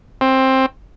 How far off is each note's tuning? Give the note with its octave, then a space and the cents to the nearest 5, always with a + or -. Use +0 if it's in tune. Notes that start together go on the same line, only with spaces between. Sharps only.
C4 +15